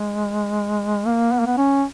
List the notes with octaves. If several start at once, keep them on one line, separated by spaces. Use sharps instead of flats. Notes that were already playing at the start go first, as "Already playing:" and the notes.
Already playing: G#3
A#3
B3
A#3
B3
C#4